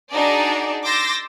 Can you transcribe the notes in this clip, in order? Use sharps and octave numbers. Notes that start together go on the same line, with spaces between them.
D4 D#4 F#4 G#4 D5
C6 D6 E6 G6 A6 A#6